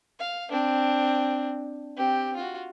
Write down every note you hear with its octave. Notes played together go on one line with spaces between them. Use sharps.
F5
C4 D4
C4 G4
F4 F#4